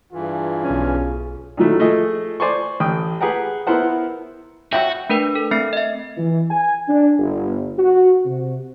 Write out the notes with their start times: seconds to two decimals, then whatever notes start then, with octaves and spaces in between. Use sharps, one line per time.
0.13 G2 E3 F4 G#4
0.64 B1 C#4
1.57 A#2 D#3 F#3 A3 E4
1.79 F3 A3 G#4 D#5
2.40 C5 D5 G#5 C6 C#6
2.80 A1 G5 D#6
3.21 G4 G#4 B4 F#5 G5 A#5
3.67 B3 E4 A#4 C5 F#5
4.73 F#3 E4 F#4 E5 G5
5.09 A3 D4 A#4 B4 G5
5.35 A4
5.51 A3 C4 E5 C7
5.73 D#5 E5
6.17 E3
6.50 G#5
6.88 D4
7.18 G1
7.78 F#4
8.25 C3